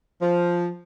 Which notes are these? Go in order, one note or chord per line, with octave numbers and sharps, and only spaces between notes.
F3